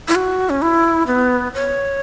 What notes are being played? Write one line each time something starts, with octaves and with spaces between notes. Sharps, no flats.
E4
F#4
C#4
E4
B3
C#5